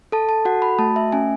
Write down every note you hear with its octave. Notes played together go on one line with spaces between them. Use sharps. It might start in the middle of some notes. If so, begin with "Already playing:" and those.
A4 A5
A5
F#4 F#5
B5
A3 A5
E5
C#4 G#5